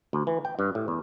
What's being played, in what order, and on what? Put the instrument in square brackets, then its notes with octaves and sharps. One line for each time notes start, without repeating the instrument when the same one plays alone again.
[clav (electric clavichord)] D2
E3
G5
G2
A2
E2